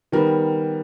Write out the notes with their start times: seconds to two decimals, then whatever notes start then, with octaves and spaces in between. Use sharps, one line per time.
0.12 D#3 G3 B3 A#4